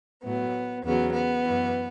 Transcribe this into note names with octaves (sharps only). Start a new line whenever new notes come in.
A2 F#3 B3
E2 C#3 F#3 B3
B3
F#2 E3